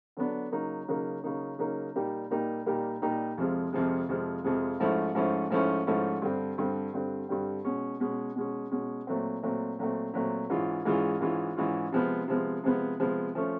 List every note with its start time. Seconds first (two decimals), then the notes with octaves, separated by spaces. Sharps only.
0.17 D3 F#3 B3 D4
0.52 C#3 F#3 A#3 D#4
0.88 C#3 F#3 A#3 D#4
1.24 C#3 F#3 A#3 D#4
1.59 C#3 F#3 A#3 D#4
1.95 A#2 G3 A#3 D#4 G4
2.30 A#2 G3 A#3 D#4 G4
2.66 A#2 G3 A#3 D#4 G4
3.02 A#2 G3 A#3 D#4 G4
3.38 F2 C3 F3 G#3
3.73 F2 C3 F3 G#3
4.09 F2 C3 F3 G#3
4.44 F2 C3 F3 G#3
4.80 G#2 F3 A3 C#4 E4
5.15 G#2 F3 A3 C#4 E4
5.51 G#2 F3 A3 C#4 E4
5.87 G#2 F3 A3 C#4 E4
6.22 G2 D3 G3 C4
6.58 G2 D3 G3 C4
6.94 G2 D3 G3 C4
7.29 G2 D3 G3 C4
7.65 B2 G#3 C#4
8.00 B2 G#3 C#4
8.36 B2 G#3 C#4
8.71 B2 G#3 C#4
9.07 A#2 F#3 A3 C4
9.43 A#2 F#3 A3 C4
9.79 A#2 F#3 A3 C4
10.14 A#2 F#3 A3 C4
10.50 G#2 E3 G#3 C#4 F4
10.85 G#2 E3 G#3 C#4 F4
11.21 G#2 E3 G#3 C#4 F4
11.56 G#2 E3 G#3 C#4 F4
11.92 C3 F3 G#3 B3
12.28 C3 F3 G#3 B3
12.64 C3 F3 G#3 B3
13.00 C3 F3 G#3 B3
13.35 F3 A3 C#4